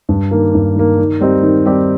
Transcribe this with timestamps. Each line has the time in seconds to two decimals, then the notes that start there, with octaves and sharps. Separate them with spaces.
0.09 G2
0.31 D#3 A#3
0.55 G2
0.76 D#3 A#3
0.98 D#3
1.20 G3 C4 D#4 G4
1.43 D#3
1.66 G3 C4 D#4 G4